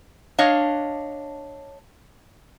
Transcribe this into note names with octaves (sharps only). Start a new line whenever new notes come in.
D4 C#5 D#5 F5